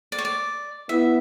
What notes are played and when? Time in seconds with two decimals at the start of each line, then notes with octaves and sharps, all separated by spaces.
0.12 D5
0.18 C#5
0.25 D5
0.89 B3 E4 E5